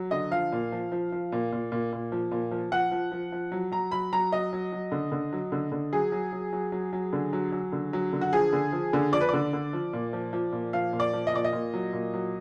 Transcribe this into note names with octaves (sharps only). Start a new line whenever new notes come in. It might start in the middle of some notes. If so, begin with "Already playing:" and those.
Already playing: F#3
D3 D#5
F3 F5
A#2
F3
F3
F3
A#2
A#2
A#2
A#2
F3
A#2
F3
F3 F#5
F3
F3
F3
F#3
F#3 A#5
F#3 B5
F#3 A#5
F#3 D#5
F#3
F#3
D3
D3
F#3
D3
D3
F#3 G#4
F#3
F#3
F#3
F#3
F#3
D3
F#3
F#3
D3
F#3
D3
F#4
F3 G#4
D3
F3
D3
F3 D5
B4
D3 D5
D3
F3
A#2
F3
F3
A#2
F3 F5
A#2
D5
F3
D#5
A#2 D5
D#5
A#2
F#3
A#2
F#3